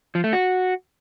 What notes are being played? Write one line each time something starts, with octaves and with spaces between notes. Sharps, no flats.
F3
A3
F#4